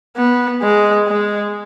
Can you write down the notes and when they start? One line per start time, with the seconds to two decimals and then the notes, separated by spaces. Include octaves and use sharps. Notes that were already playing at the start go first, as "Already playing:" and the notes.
0.17 B3
0.62 G#3
1.08 G#3